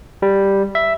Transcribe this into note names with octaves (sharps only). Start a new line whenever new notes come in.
G3
E5